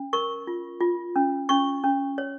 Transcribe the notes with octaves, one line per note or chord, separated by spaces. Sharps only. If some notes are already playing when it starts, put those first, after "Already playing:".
Already playing: C#4
A#4 C#6
F4
F4
C#4
C#4 C#6
C#4
C#5